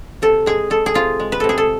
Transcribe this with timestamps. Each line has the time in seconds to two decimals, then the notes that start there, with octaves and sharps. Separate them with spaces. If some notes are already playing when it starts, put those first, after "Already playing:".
0.22 C3 A4
0.46 G#3 G#4
0.70 G#3 A4
0.86 G#4
0.94 C3 F4
1.20 G#3
1.32 B4
1.40 C3 A4
1.49 G#4
1.58 A4